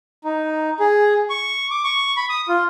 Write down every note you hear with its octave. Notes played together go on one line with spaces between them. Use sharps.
D#4
G#4
C#6
D6
C#6
B5
D#6
F4